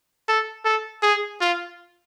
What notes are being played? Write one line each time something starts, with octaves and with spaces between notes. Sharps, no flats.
A4
A4
G#4
F4